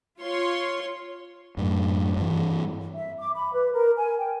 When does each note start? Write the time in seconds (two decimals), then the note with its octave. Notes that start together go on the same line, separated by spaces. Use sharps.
0.19 F4 C#5 C6
1.57 F#2 A2
2.17 G2 E3
2.94 E5
3.18 D6
3.35 B5
3.52 B4
3.73 A#4
3.97 G#5
4.17 G5